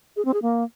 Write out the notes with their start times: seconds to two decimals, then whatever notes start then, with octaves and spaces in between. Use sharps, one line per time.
0.16 G#4
0.25 C4
0.34 G#4
0.42 A#3